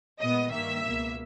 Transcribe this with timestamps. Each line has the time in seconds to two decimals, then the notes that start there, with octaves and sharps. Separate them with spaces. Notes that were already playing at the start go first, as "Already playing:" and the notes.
0.20 A#2 G#3 B3 D#5
0.52 G2 D#3 A#3 E5
0.84 C#2 B2 A#3